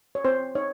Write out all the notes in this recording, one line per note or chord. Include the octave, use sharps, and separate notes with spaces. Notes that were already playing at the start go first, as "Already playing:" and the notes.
C#5
C4 C5
D#4 C#5